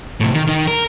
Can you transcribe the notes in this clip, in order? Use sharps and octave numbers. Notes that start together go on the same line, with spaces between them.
A2 C3
D#3
D#3 D#4
A#4